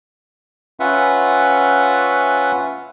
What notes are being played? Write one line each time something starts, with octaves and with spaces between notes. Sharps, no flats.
C#4 F4 B4 E5 F#5